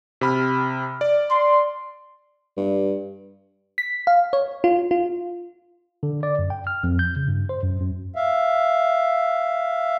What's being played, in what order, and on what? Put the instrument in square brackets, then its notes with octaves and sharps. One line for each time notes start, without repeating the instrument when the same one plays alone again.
[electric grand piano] C3 B5 F6
D5
[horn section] C6
[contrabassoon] G2
[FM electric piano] B6
F5
C#5
F4
F4
[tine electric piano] D3
D5
F#2
G5
F6
F2
G6
C#3
G2
C5
F#2
F#2
[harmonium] E5 F5